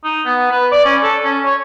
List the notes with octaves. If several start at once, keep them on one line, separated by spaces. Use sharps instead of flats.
D#4
B3
B4
D5
C#4
A4
C#4
C#5